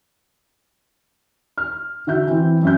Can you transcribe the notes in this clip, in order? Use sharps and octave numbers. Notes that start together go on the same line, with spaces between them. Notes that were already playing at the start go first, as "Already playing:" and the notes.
F6
D3 F#4 E5 G6
E3 C4
F#2 E5 G6